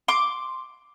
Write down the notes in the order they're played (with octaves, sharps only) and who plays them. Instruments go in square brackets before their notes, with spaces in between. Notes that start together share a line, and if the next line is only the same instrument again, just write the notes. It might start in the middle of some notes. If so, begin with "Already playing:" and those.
[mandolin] C6 D6